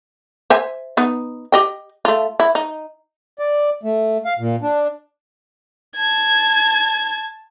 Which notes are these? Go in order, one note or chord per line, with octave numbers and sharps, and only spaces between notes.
C5 E5 G#5
B3 D#4
G4 D#5 G5
A3 F4
E4
D#4
D5
A3
F5
A#2
D4
A5 G#6